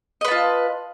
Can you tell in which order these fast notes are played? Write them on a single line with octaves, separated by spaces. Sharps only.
D#5 B4 A5 F4